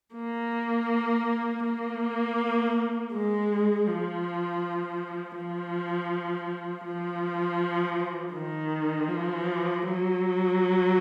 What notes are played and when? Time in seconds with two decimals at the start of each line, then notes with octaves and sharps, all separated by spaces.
0.15 A#3
1.64 A#3
3.13 G#3
3.87 F3
5.36 F3
6.85 F3
8.33 D#3
9.08 F3
9.83 F#3